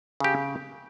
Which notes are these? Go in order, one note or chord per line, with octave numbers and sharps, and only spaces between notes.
C#3 G4